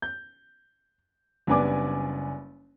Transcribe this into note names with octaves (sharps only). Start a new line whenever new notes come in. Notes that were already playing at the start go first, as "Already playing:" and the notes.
G6
F#1 G3 B3 D4 G#5 D6